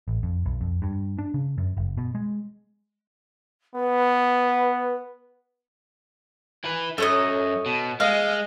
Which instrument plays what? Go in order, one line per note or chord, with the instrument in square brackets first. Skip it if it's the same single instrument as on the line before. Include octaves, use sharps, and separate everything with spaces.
[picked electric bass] A1
F2
B1
F2
G2
D4
C#3
F#2
F#1
B2
G#3
[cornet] B3 [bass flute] B4
[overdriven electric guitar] E4 B4
[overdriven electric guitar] F#2 [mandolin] A4 C#5 D#5
[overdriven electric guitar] B2
[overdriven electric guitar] G#3 [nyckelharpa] D#5 [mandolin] F5